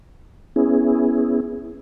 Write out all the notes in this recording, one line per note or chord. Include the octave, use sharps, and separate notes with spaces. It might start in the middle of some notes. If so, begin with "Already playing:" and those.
B3 C#4 E4 G#4